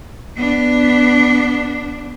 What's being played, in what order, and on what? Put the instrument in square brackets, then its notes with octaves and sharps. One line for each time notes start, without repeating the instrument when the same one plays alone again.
[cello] B3 D4